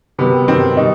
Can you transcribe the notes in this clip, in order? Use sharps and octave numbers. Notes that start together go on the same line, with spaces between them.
C3 D#3 F#3 B3
C3 D#3 F#3 C4
B2 G3 D#4